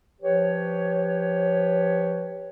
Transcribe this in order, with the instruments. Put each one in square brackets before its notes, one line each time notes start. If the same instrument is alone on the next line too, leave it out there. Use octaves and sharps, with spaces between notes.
[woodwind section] F3 G4 B4 C#5